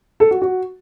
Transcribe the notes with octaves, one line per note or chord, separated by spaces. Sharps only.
A4
F#4
F#4